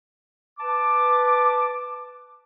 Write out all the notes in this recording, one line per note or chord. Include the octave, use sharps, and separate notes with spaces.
B4 A5 D6